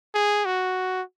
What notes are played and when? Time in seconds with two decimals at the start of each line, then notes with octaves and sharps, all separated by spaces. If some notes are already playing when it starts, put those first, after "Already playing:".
0.15 G#4
0.45 F#4